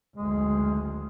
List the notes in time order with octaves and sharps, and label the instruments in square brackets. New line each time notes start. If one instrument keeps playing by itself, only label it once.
[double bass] F#1 D2 [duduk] G#3